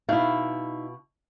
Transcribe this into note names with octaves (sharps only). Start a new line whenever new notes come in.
B2 D#4 E4 F5